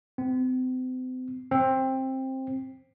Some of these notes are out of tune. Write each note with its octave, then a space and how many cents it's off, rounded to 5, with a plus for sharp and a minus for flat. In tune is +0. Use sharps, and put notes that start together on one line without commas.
C4 -40
C4 +15